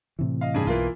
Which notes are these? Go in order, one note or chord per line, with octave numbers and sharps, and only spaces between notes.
A2 C3 E3
D#5 F5
G2 C#4 G#4
B1 E3 A#3 F4